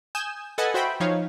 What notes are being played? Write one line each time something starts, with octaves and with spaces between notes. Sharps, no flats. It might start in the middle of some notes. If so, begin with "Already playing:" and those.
G#5 D#6 G6 E7
A4 B4 D#5 F#5 G#5 A5
F#4 C5 E5 G5 B5
F3 D#4 C#5 F5